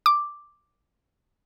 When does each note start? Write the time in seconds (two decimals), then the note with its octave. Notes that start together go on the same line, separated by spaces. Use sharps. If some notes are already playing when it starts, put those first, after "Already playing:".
0.06 D6